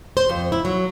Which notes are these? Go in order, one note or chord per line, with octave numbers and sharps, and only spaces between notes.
C5
F2
E4
F#3